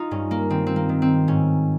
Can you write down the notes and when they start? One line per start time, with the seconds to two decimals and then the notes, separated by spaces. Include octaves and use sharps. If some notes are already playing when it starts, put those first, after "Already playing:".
Already playing: D#4 F4
0.11 G2 C#4
0.31 A#3
0.50 D#3 C4
0.67 C4
0.76 A#3
0.89 D#3
1.02 C4
1.28 G#2 C#4